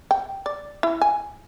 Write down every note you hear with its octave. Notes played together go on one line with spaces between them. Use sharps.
G5
D5
E4
G#5